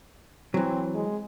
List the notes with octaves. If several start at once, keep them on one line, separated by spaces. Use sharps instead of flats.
E3 F#3 C4
G#3